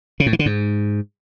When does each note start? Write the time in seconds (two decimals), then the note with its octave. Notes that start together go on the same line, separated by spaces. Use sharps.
0.20 C#3
0.26 A2
0.33 E3
0.39 D3
0.46 G#2